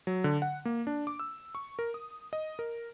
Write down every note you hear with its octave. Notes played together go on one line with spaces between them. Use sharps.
F#3
D3
F#5
A#3
D4
D6
E6
C#6
A#4
D#6
D#5
A#4